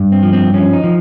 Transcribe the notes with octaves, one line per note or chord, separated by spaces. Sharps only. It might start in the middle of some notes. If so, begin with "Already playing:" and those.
Already playing: G2
C4
F3
C4
F3 C#4
D#4
F3